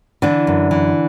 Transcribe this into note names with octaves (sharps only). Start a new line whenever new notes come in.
D3 E3 D4
F#2
E3